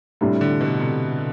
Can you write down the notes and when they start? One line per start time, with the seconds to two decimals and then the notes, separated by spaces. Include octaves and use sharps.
0.21 A2 C3 G3 D4
0.41 D3
0.61 B2
0.80 C3